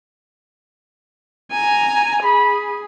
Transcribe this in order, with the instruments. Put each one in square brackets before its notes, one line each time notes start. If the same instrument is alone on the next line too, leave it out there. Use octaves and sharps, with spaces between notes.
[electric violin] G#5 A#5
[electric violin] G#4 [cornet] B5